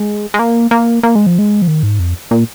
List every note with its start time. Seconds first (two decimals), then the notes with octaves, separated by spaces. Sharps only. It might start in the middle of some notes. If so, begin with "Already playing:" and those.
Already playing: G#3
0.34 G#3
0.39 A#3
0.71 A#3
1.03 A#3
1.15 G#3
1.27 F3
1.39 G#3
1.62 F3
1.68 D#3
1.83 G#2
1.99 F2
2.31 A#2